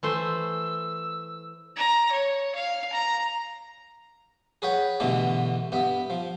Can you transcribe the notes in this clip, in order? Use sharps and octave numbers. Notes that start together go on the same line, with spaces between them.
E3 A3 C5 E6
A#5
C#5
F5
A#5
G#4 B4 C#5 F#5 G5
G2 B2 D3 E3 A3
G2 B3 E5
F3